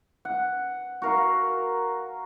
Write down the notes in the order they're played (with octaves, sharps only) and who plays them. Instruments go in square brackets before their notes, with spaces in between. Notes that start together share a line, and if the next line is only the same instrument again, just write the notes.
[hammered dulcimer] F#5
F#4 A#4 F5